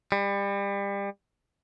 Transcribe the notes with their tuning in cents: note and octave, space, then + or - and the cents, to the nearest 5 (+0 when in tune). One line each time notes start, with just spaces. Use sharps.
G3 +30